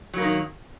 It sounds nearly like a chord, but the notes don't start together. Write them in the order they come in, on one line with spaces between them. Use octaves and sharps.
F#3 A#3 D#3